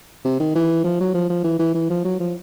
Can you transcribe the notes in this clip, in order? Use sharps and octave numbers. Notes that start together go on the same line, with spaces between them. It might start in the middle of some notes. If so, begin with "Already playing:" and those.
C3
D#3
E3
F3
F#3
F3
F3
E3
E3
E3
F3
F#3
F3